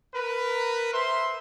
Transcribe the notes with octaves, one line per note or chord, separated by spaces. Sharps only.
A#4 B4
C5 E5 B5 C6